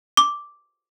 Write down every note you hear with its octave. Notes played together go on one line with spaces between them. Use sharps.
D6